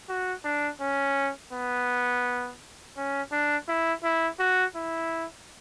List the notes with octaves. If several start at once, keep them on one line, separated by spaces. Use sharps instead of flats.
F#4
D4
C#4
B3
C#4
D4
E4
E4
F#4
E4